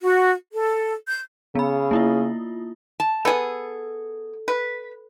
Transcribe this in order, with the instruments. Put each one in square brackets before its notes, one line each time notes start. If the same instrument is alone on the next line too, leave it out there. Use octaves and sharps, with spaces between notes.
[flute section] F#4
A4
G6
[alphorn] C#3 [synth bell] B3 B5
[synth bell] A#3 E4 F4
[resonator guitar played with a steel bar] A5
[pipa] B3 G#4 [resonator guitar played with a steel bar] A4
[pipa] B4